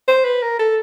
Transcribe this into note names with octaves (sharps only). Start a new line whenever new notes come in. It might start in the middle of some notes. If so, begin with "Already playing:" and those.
C5
B4
A#4
A4